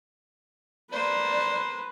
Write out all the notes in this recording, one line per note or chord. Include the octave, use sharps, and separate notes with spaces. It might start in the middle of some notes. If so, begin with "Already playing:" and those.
A#3 B4 C5 D5